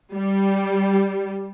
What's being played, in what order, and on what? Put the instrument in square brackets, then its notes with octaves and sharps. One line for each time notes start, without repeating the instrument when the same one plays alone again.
[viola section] G3